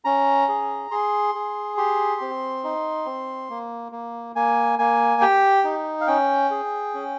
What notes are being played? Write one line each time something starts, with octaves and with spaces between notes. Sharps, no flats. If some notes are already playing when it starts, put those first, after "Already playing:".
C#4 A#5
G#4
G#4 C6
G#4
G4 C6
C4
D#4
C4
A#3
A#3
A#3 G#5
A#3 G#5
G4 G5
D#4
F5
C#4 G5
G#4
C#4